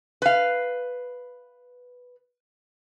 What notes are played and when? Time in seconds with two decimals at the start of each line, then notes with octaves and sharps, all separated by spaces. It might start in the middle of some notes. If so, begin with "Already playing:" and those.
0.22 B4 F5